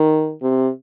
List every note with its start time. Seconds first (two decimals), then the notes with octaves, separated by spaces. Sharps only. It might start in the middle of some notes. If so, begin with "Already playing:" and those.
Already playing: D#3
0.42 C3